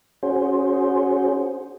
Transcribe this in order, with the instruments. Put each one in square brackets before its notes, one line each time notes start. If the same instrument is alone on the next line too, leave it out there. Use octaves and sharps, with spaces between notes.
[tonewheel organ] C#4 F#4 G#4 C5